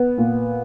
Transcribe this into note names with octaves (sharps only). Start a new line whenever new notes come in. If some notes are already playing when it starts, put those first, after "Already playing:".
Already playing: B3
A#2